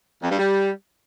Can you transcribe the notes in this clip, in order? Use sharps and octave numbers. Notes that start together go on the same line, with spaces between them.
F2
G2
G3